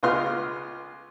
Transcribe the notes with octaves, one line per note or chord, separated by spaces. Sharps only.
C#2 B3 F4 D#5 C6 F6